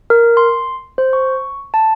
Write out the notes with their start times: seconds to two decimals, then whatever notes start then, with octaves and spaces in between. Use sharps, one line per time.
0.10 A#4
0.37 C6
0.98 C5
1.13 C#6
1.74 A5